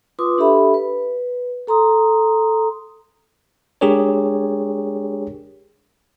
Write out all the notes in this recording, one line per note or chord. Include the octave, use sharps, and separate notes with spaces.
F4 B4 C6 D6 D#6
D4 G4 A4 E5 B5
B4
A4 A#5 C6 D#6
G#3 D4 G4 G#4 A#4 C#5